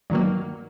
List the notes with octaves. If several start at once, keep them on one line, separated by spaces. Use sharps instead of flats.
G2 D#3 F#3 A#3